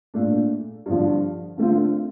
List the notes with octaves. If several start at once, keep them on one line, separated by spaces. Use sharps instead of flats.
A#2 A3 D4
G2 D3 F3
D3 A3 C4 F4